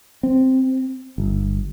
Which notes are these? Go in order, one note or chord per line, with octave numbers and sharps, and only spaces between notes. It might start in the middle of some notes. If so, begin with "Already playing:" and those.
C4
G1